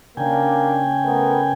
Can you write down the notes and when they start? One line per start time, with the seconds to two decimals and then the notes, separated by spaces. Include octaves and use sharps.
0.17 C#3 A#3 D4 G5 G#5
1.04 A3 B3 A#4